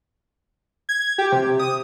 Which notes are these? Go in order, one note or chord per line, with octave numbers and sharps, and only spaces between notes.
G#6
G4
C3
D#6